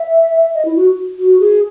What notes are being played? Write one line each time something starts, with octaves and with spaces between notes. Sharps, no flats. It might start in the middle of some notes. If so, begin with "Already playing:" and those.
Already playing: E5
D#5
E4
F#4
F#4
G#4